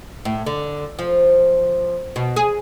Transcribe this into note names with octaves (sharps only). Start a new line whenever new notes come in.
A2
D3
F3
B2
G#4